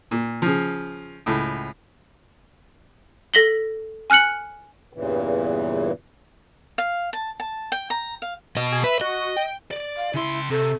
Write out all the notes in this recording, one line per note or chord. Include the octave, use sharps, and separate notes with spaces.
A#2
C#3 F3
C#2 A2
A4 A#6 B6 F#7 G7
G#5 F6 F#6 C#7 F#7
E2 G2 A#2 C#3 E3
F5
A5
A5
G5
A#5
F5
B2 D#5
G#4
B4 E5
F#4 D#5
G5
D5
F5
C#3 E4 C6
C3 A4